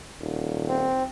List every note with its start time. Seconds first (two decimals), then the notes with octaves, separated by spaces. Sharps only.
0.21 D#1
0.68 C4